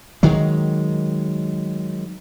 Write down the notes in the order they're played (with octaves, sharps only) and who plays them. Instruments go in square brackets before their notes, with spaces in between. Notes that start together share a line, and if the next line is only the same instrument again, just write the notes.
[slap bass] D#3 F#3 G#3